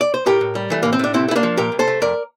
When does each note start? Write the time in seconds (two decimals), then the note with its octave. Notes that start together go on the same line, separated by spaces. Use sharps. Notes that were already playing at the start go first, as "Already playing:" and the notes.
0.01 D5
0.14 C5
0.26 A2 G4 A#4
0.41 A2
0.55 G3
0.70 E3 A3
0.83 A2 A#3
0.93 C4
0.99 A2 D4
1.14 C2 C4 E4
1.28 A3
1.31 E4
1.36 A#3 D4
1.43 F3
1.57 A#2 G4 A#4
1.72 C2
1.79 A4 C5
1.87 A3
2.02 F2 A#4 D5